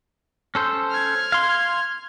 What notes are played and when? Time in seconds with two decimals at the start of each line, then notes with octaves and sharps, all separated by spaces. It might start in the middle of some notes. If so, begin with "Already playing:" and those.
0.55 C#4 A4 C5
0.91 F6 G#6
1.32 F5 C6